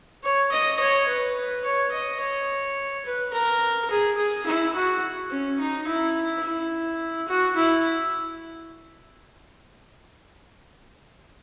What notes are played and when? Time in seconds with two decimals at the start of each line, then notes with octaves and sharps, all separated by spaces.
0.23 C#5
0.52 D#5
0.80 C#5
1.08 B4
1.64 C#5
1.92 D#5
2.21 C#5
3.05 B4
3.33 A#4
3.90 G#4
4.17 G#4
4.46 E4
4.75 F#4
5.31 C#4
5.60 D#4
5.87 E4
6.44 E4
7.28 F#4
7.56 E4